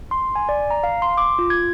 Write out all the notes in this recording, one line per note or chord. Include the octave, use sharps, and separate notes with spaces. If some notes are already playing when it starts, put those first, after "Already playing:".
C6
G#5
D5
A#5
F5
C6
D6
F4
G#6